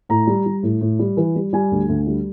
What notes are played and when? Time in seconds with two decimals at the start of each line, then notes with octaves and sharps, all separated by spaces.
0.09 A2 A#5
0.27 G3
0.46 G3
0.63 A2
0.81 A2
0.99 G3
1.17 E3
1.35 G3
1.53 G3 G#5
1.71 D2
1.89 D2
2.07 G3